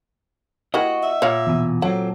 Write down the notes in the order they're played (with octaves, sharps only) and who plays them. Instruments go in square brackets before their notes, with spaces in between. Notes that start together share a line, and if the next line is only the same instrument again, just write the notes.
[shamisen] A#3 E4 G4 [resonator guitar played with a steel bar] F#4 [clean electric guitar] D#5
[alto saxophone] E5
[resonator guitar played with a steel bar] A#2 [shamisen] C#5 F5
[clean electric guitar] E2 B2
[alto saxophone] F#3 [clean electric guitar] C4 A4 [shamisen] F#5